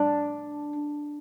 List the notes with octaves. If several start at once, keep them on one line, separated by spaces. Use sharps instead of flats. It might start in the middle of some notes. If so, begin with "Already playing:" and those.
Already playing: D4